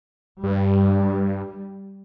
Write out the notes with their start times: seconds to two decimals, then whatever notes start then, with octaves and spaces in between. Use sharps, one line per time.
0.43 G2 G3